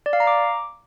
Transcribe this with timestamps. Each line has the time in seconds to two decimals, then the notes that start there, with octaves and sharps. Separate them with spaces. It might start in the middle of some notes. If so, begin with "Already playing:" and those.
0.06 D5
0.13 F5
0.20 A#5
0.27 D6